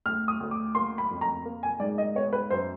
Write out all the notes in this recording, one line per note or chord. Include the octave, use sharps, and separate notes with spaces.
D2 F6
D#6
D2
D6
A#3 C6
B5
F2
A#5
A#3
G#5
G#2 D5
D#5
B3 C#5
B4
F#2 C5